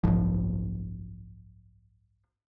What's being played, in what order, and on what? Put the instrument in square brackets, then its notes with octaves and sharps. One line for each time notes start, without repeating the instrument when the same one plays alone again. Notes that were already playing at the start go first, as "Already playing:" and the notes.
[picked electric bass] F#1 B1 G#2 F3